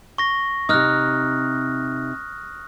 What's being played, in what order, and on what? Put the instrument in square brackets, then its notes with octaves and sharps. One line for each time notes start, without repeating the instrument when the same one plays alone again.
[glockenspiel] C#6 A#6
[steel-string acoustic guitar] C3 D#4 [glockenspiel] D#6 F6 F#6